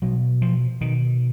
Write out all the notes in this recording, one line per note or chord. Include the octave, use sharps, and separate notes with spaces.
B2 F#3
F3
B2 D#3